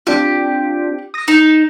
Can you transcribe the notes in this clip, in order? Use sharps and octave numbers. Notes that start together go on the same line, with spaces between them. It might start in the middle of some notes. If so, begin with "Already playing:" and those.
C4 D4 F4 G4
D#6 A#6
D#4 E7